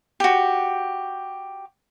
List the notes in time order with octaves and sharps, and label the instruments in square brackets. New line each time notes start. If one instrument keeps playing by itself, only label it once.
[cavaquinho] F#4 G4